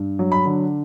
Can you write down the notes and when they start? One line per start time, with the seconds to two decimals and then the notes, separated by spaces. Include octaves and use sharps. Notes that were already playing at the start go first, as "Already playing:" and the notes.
Already playing: G2
0.19 F#3
0.32 B5
0.45 D3